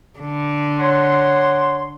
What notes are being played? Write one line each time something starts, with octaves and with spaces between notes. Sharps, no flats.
D3
C#5 F#5 C6